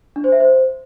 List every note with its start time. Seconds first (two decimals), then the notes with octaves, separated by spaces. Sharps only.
0.16 D4
0.24 C5
0.32 E5
0.40 C5